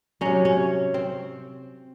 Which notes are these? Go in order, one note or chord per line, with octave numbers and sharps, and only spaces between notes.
C3 F#3 C#4
C#4
C4